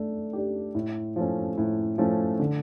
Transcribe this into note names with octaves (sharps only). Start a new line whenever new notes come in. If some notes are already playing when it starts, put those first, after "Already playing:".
Already playing: A3 D4
D4 G4
A2
F3 A3 C#4
A2
F3 A3 C#4
D3